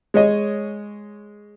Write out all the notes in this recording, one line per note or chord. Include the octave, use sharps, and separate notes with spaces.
G#3 C#5 D#5